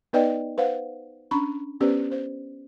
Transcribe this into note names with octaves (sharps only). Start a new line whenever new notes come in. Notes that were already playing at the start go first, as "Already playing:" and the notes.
B3 D#4 B4 D5 D#5 G5
B4 C5 F5 F#5
C#4 D4 A#5 B5 C#6
B3 C#4 G4 B4 C5 D5
C5